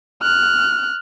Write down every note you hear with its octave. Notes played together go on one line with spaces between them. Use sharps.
F6 F#6